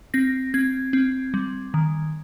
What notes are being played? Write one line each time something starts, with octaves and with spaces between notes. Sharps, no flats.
C4 A#6
C4 G#6
C4
G3
D#3